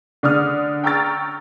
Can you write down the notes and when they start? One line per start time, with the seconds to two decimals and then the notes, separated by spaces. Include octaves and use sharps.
0.23 D3 D5 D#6 F6
0.84 G5 A#5 C#6 E6 F6 A6